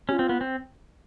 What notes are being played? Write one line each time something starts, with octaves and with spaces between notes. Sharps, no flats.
C#4 F4 G4
C4
B3
C4